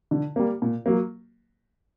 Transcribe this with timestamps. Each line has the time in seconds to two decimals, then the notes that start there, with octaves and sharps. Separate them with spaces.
0.11 D3
0.36 G3 A#3
0.62 A#2
0.86 F#3 A#3